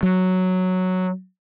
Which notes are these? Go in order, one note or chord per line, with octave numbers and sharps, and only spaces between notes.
F#3